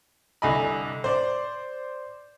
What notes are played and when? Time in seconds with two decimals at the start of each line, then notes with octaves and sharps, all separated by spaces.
0.42 C2 D3 D#5 G#5 B5
1.04 C5 D5